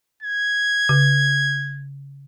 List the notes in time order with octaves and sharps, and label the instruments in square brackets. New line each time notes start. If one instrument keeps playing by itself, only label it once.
[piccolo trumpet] G#6
[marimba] C#3